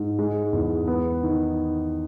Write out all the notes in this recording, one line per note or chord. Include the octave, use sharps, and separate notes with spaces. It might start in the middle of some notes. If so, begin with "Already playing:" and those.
Already playing: G#2
G#3
E2
B3
D#3